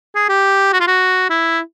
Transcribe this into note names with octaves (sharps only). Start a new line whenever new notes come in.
G#4
G4
F#4
F4
F#4
E4